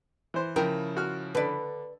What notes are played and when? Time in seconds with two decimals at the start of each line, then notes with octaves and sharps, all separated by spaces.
0.34 E3 C5
0.56 C#3 F3 E4 A#4 G5
0.97 F#4 F6
1.35 D3 B4 D5